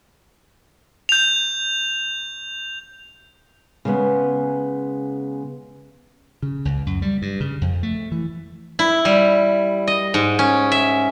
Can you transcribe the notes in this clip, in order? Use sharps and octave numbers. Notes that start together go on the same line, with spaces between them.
G6 F7
C#3 G#3 B3
C#3
C#2
F#2
G3
G2
C#3
F2
A3
E3
E4
G3
D#5
G#2
C#4
E5